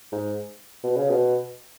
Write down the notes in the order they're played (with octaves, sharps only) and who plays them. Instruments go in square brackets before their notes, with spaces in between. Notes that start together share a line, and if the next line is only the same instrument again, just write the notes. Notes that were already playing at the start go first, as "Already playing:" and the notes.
[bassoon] G#2
B2
C#3
B2